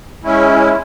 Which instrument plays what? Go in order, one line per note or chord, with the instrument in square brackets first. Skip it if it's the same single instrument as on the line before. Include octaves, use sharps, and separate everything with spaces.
[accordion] G#3 C#4 E4